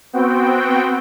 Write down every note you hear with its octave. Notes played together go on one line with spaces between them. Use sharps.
B3 C4 F#4 G5